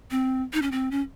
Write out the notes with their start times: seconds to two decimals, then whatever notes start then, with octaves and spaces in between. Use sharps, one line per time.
0.11 C4
0.53 D#4
0.62 C#4
0.72 C4
0.91 C#4